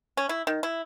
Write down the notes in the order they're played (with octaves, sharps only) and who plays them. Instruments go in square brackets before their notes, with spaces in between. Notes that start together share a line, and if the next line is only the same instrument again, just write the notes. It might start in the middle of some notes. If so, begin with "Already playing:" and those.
[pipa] C#4
E4
D#3
E4